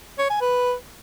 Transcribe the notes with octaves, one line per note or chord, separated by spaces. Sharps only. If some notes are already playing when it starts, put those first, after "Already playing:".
C#5
G#5
B4